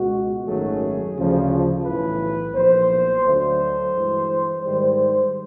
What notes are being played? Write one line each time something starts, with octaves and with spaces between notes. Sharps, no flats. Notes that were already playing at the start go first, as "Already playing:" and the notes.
Already playing: C#2 B2 G#3 F#4
G#1 F#2 D#3 F#3 A3 G#4
D2 C#3 F3
B1 A2 E3 B4
B1 A#2 F3 C5
D2 D3 F#3 A3 C5
G2 E3 G#3
G#2 D#3 G3 C5